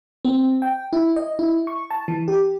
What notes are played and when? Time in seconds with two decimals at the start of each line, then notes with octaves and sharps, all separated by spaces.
0.25 C4
0.62 G5
0.93 E4
1.16 D#5
1.39 E4
1.67 C#6
1.91 A5
2.08 E3
2.28 G4